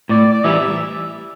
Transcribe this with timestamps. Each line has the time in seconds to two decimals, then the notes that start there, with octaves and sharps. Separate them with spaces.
0.09 A2 D5
0.33 D5
0.44 E3 G3 E5